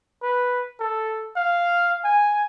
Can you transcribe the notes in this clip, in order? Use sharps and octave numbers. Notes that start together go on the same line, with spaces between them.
B4
A4
F5
G#5